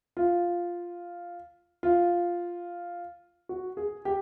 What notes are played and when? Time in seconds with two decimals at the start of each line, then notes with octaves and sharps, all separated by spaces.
0.17 F4
1.83 F4
3.49 F#4
3.77 G#4
4.05 G4